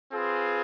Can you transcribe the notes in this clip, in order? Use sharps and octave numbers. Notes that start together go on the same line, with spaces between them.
C4 F4 G#4 B4